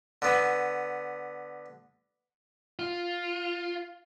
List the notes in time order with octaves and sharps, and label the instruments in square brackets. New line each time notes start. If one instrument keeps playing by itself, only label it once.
[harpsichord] D3 B3
[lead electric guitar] F4